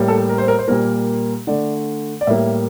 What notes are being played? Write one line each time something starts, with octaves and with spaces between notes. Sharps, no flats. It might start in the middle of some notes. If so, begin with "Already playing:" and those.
Already playing: A2 G3 A#3
A4
A#4
C5
A#4
C5
A#2 G3 A#3 A#4
D3 A3 D5
D5
A2 G3 A#3 E5